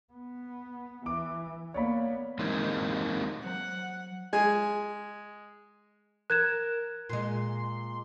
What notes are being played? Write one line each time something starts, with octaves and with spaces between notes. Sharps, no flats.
B3
E3 D6
A#3 B3 C#5 D5 B5
E3 G#3 A#3 C4 D#4
F#3 C5 F#5 A#5
G#3 G#5
A#4 F#6 G#6 E7
A#2 G#3 C6